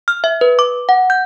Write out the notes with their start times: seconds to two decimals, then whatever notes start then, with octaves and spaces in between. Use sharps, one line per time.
0.08 F6
0.24 E5
0.41 B4
0.59 D6
0.89 F#5
1.10 G6